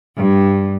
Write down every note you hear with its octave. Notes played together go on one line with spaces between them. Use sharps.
G2